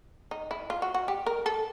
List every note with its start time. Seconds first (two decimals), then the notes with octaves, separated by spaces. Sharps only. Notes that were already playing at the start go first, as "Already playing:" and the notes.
0.31 D#4
0.51 E4
0.70 F4
0.82 F#4
0.94 F#4
1.08 G4
1.26 A#4
1.46 A4